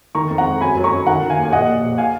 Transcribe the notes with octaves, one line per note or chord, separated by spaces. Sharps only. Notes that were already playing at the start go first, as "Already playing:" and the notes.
D#3 A#5 C#6
F2
F#5 A#5
G#3
F#2 G#5 B5
F#3
A#5 C#6
F#2
D#3 F#5 A#5
D#3
F5 G#5
D#2
G#5
A#1 D#5 F#5
A#1
A#1
F5 G#5